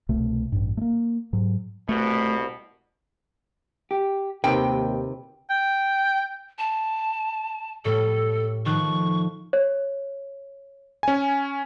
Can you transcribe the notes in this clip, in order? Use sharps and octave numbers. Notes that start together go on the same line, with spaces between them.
C2 B2 A3
A1 G2
A3 A#3
G#2 F#3
C2 B2 A3
G4
D#2 C3 D#3 B4 G5
G5
A5
A2 G3 A4
D#3 F3 C#6 F#6
C#5
C#4 G#5